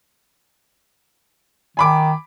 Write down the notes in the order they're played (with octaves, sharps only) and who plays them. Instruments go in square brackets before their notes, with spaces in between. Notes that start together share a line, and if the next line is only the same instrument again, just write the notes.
[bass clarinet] D#3 [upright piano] G#5 B5 D6